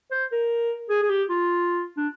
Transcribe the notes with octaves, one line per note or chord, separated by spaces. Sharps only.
C5
A#4
G#4
G#4
G4
F4
D4